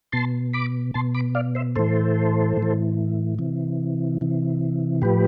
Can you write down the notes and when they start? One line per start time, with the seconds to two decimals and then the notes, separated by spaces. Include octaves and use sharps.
0.12 B2 A5 C6
0.54 B5 D6
0.94 B2 A5 C6
1.14 B5 D6
1.35 D5 F5
1.55 C5 E5
1.76 A2 E3 A4 C5
2.57 A2
2.62 E3
3.39 C3 E3
4.21 C3 E3
5.02 A2 F3 G4 B4